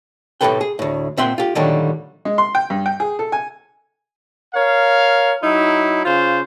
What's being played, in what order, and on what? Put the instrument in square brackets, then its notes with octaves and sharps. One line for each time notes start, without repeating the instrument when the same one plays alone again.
[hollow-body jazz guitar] A2 C3 G#3 A4 B4 G5
G#4
D2 A2
A#2 C4 E5 F#5 G5 C6
F4 G4
A#2 D3 D#3 F#3 G3 A3
[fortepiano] G#3
C6
G5
G2
G5
G#4
A4
G#5
[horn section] A#4 C#5 F5
F#3 D#4 E4
C#3 F4 C5